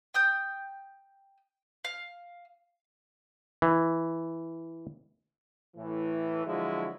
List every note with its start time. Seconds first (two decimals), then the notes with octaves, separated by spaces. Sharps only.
0.14 G5 D#6 G6
1.85 F5
3.62 E3
5.76 A2 E3
6.46 D3 F3 F#3 G#3 E4